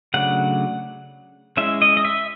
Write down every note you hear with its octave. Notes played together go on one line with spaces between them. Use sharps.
C#3 F#3 A3 D4 F#5
G#3 C#4 E4 E5
D#5
D#5
E5